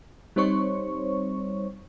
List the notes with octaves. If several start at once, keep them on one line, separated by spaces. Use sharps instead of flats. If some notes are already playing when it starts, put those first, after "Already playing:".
G3 C4 D#4 C5 C#5 C#6